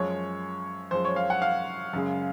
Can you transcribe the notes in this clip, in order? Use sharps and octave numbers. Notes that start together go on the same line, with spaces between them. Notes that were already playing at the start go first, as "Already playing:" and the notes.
Already playing: F#2 F3 G#3 C#5
F#2 F3 G#3 C5
C#5
F5
F#5
F5
F#2 C#3 G#3